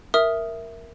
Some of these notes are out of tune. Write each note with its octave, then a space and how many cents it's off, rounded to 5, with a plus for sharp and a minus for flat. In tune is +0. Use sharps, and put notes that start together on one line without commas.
A#4 +0 E5 +0 D#6 +0